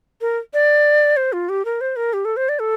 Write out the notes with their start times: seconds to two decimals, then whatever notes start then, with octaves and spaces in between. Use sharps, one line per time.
0.21 A#4
0.54 D5
1.17 C5
1.33 F4
1.49 G4
1.65 A#4
1.81 C5
1.96 A#4
2.13 G4
2.25 A4
2.37 C5
2.49 D5
2.60 A4